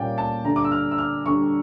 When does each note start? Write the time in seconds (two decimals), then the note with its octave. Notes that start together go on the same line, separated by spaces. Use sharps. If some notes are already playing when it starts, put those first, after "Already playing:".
Already playing: A#2 G3 A#3 C#4 D5 F5 G5
0.18 A5
0.45 D3 G3 D4 A#5
0.56 D6
0.64 E6
0.72 F6
0.91 E6
0.98 F6
1.26 D3 G3 D4 C#6